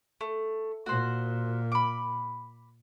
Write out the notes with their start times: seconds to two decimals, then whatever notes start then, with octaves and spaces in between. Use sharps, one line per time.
0.21 A3
0.86 A#2 F#4 C5
1.72 B5 D6